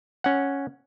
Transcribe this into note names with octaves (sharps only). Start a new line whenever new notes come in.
C#4 F#5